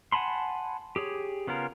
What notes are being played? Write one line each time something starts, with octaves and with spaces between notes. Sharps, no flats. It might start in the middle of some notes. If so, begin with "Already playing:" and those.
F#5 G#5 A5 B5 C6
G4 G#4 C#5
C#3 B3 C#4 F4 A#4